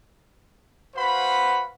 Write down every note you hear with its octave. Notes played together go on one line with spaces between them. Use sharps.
F#4 B4 C5 F5 F#5 B5